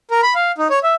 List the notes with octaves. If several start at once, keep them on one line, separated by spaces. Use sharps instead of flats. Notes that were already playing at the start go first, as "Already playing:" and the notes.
A#4
B5
F5
D#4
C#5
E5